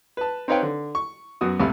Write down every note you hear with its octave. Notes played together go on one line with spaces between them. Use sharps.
B4 A5
C4 D#4 B4 C#5 F5 G5
D3
C#6
F#2 B3 F#4 D#6
C#2 A2 C3 F5 B5